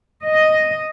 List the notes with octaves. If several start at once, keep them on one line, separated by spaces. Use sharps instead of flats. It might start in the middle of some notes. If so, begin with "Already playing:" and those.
D#5